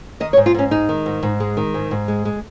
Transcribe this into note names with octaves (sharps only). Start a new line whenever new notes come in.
D#3 D#5
C#5
G#2
F4
G#2 C#4
G#3 D#4
D#3
G#2
G#2
G#3
D#3
G#2
G#2
G#3
G#3